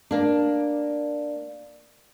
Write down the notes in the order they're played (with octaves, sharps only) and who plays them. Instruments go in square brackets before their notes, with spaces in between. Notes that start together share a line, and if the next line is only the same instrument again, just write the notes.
[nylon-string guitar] A#3 D4